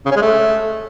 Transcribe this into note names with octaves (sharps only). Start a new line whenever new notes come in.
C#3
C#4
G#3
A3